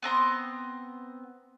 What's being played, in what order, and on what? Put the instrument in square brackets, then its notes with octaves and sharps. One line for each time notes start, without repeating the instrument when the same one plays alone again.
[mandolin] B3 C4 A#5 C6